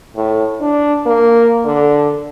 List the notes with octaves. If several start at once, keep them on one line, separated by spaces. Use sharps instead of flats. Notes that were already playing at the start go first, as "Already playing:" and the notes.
A2
D4
A#3
D3